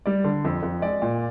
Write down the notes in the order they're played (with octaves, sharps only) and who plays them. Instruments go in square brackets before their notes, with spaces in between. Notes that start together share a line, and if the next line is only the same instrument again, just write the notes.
[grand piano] G3 D5
D3
F2
F2
G#3 D5
A#2